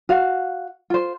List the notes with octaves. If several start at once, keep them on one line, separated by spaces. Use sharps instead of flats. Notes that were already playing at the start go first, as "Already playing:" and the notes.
F#4 F5
F4 C5